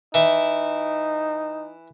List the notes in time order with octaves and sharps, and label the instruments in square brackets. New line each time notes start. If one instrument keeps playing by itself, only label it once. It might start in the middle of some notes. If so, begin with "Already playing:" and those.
[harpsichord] E3 E4 [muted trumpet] D#4